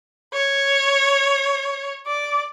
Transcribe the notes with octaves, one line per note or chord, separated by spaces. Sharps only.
C#5
D5